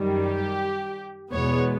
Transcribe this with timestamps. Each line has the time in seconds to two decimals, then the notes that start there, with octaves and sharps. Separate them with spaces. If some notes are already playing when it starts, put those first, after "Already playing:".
Already playing: F#2 D#3 G3
0.26 G4
1.33 E2 B2 G#3 B3 C#5